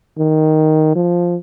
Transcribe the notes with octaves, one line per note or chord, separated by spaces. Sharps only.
D#3
F3